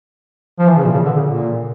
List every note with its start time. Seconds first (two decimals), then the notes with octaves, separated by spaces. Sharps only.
0.59 F3
0.67 E3
0.77 C#3
0.84 A#2
0.93 C#3
1.05 D3
1.16 C#3
1.28 A#2